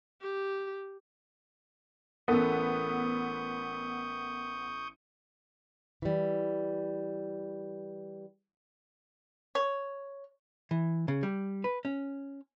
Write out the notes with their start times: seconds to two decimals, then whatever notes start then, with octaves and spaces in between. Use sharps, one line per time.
0.22 G4
2.28 A1 B3 A4 A#4 C#6 D#6 G6
6.02 E3 G3
9.55 C#5
10.71 E3
11.08 C#3
11.23 G3
11.64 B4
11.85 C#4